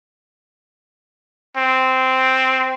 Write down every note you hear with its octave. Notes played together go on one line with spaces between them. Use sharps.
C4